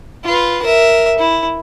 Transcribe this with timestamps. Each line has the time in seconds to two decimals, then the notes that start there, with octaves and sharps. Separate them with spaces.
0.25 F4 B4
0.62 A#4 E5
1.18 E4